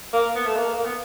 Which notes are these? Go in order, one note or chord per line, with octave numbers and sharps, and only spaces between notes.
A#3
B3
A3
A#3
A#3
B3